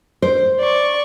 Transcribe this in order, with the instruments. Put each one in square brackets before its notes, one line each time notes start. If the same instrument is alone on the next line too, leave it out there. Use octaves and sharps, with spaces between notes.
[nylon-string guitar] C5
[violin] D5 C#6